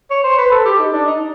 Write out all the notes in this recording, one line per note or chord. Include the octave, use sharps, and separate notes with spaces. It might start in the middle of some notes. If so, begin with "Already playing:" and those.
C#5
C5
B4
A4
G4
D#4
D4
D#4